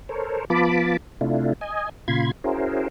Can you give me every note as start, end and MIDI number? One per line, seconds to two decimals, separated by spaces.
0.09 0.45 69
0.09 0.45 70
0.09 0.45 72
0.09 0.45 73
0.50 0.97 53
0.50 0.97 59
0.50 0.97 65
0.50 0.97 81
0.50 0.97 83
0.50 0.97 86
1.21 1.53 48
1.21 1.53 57
1.21 1.53 62
1.21 1.53 64
1.21 1.53 65
1.61 1.89 75
1.61 1.89 80
2.08 2.31 46
2.08 2.31 49
2.08 2.31 65
2.08 2.31 83
2.08 2.31 84
2.08 2.31 92
2.44 2.88 61
2.44 2.88 64
2.44 2.88 66
2.44 2.88 68
2.44 2.88 70
2.44 2.88 72